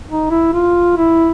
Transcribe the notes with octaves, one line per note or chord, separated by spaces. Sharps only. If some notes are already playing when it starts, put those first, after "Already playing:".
D#4
E4
F4
E4